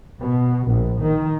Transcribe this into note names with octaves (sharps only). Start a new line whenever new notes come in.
B2
A#1
D#3